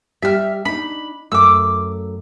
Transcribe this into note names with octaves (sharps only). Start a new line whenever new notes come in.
G3 G4 E5 F6
D4 D#4 B5
F#2 A3 D6 E6